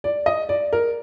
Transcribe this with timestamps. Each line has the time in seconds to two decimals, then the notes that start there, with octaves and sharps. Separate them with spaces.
0.04 D5
0.26 D#5
0.49 D5
0.73 A#4